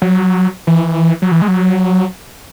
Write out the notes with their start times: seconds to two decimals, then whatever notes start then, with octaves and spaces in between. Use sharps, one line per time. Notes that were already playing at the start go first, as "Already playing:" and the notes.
0.02 F#3
0.67 E3
1.22 F#3
1.31 E3
1.42 G#3
1.48 F#3